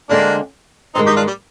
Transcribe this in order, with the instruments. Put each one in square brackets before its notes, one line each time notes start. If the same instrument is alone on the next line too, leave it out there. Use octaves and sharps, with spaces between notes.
[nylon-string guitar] D2 D3 G#3 C4 [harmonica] A#3 D4
[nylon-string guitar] G2 D#3 G#3 [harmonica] C4 D#4
[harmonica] D#4 G4
D4 F4
G3